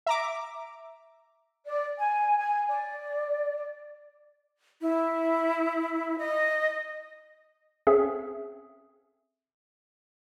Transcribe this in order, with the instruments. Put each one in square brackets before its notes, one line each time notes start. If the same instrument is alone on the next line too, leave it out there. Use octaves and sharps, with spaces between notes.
[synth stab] E5 A#5 D6
[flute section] D5
G#5
G#5
D5
[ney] E4
D#5
[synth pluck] C4 C#4 G#4 A4 E5